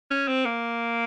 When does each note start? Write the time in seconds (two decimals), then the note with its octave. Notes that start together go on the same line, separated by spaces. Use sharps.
0.11 C#4
0.28 C4
0.45 A#3